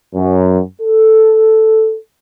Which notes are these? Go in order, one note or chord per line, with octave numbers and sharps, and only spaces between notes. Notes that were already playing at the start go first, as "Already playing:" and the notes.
F#2
A4